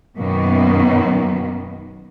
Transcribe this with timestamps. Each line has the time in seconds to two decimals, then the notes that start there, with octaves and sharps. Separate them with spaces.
0.18 F#2 B2 D#3 A#3 B3